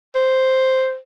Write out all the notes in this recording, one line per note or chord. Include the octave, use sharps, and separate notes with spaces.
C5